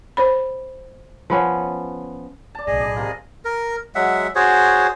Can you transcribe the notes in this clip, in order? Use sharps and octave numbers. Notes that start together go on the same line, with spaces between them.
C5 C#5 B5
F3 B3 C#4
D5 A5
B1 A2 G#4 D#5
D5 B5
C3 D#3 F4
A#4
F#3 G#3 E5 F#5
F#4 G#4 C5 C#5